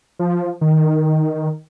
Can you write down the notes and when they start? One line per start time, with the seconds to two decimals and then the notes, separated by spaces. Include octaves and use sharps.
0.19 F3
0.61 D#3